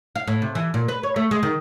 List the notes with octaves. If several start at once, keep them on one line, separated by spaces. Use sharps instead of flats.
F5
A2
C3
E3
A#2
B4
C#5
A3
G#3
D#3